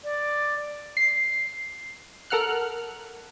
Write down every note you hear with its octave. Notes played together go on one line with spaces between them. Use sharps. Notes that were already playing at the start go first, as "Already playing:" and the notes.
D5
C7
A4 A#4 F#5 F6 F#6